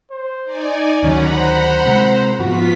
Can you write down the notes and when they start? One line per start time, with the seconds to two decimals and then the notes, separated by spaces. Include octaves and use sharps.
0.11 C5
0.44 D#4 D5 G#5
1.03 D2 D#3 F#3 C#4 F#5 A#5 B5
1.38 C5
1.85 C3 G#3
2.39 G#2 F3 B3 F4 F#4 B6